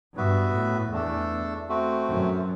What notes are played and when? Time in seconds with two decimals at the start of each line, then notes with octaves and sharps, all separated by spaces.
0.17 G2 B3 F#4 B4 E5
0.54 A2
0.92 E2 A3 D4 A4
1.69 A3 C4 F#4
2.07 F#2